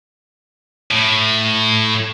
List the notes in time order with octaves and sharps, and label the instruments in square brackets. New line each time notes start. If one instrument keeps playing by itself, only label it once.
[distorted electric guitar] A2